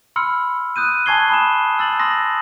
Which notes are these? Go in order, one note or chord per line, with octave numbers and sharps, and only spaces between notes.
B5 C6 E6 F6 C#7
D#6 F#6 G6 D#7
G#5 A5 C#6 G#6 C7 G7
B5 D#6 E7
E6 A6 F#7
C6 D#6 E6 A#6